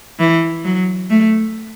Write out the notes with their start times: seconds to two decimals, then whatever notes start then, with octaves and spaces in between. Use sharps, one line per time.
0.19 E3
0.64 F#3
1.10 A3